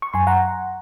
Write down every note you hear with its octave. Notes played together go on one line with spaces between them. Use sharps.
C#6
F#2 G#5 C6
F#5 A#5